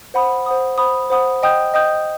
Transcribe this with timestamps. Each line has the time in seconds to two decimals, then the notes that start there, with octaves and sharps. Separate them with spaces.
0.14 C5 F#5 B5 D#6
0.46 C5 F#5 B5 D#6
0.78 C5 F#5 B5 D#6
1.10 C5 F#5 B5 D#6
1.43 D#5 G5 D#6 G6
1.74 D#5 G5 D#6 G6